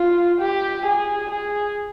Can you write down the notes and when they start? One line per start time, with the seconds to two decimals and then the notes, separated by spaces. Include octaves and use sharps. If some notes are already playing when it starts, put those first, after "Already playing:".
Already playing: F4
0.40 G4
0.85 G#4
1.30 G#4